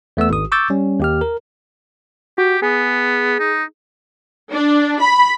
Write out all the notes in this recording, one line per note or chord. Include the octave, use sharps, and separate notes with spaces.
E2 A3 B3 E6
G#1 D#6
C#6 D6 E6 G6 A6
G3 C#4
D#2 G4 F6
A#4
F#4 G4
B3 G#4
D#4
D4
B5